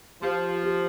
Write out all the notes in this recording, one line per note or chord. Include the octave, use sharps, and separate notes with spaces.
F3 G4
G4